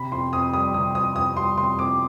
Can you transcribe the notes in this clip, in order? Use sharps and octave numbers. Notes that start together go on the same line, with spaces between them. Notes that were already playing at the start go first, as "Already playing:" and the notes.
Already playing: C3 B5
F2 C6
F2 D#6
G3 D#6
C3 D#6
F2 D#6
F2 D#6
G3 C6
C3 C6
F2 D6